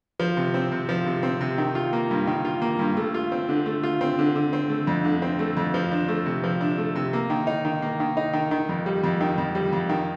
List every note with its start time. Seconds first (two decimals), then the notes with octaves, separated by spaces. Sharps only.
0.20 F3
0.37 C3
0.54 C4
0.72 C3
0.89 F3
1.06 C3
1.23 C4
1.40 C3
1.58 D#3
1.75 F4
1.93 A#3
2.11 G2
2.27 D#3
2.45 F4
2.62 A#3
2.79 G2
2.97 A3
3.14 F4
3.32 C4
3.49 D3
3.66 A3
3.83 F4
4.01 C4
4.19 D3
4.36 D3
4.53 C4
4.70 A3
4.87 F2
5.04 D3
5.22 C4
5.39 A3
5.57 F2
5.74 F3
5.91 D4
6.08 A3
6.26 C3
6.44 F3
6.61 D4
6.78 A3
6.95 C3
7.13 A#3
7.30 D#3
7.47 D#4
7.65 D#3
7.82 A#3
8.00 D#3
8.17 D#4
8.33 D#3
8.51 D#3
8.69 F2
8.86 G3
9.04 F2
9.21 D#3
9.38 F2
9.55 G3
9.73 F2
9.89 D#3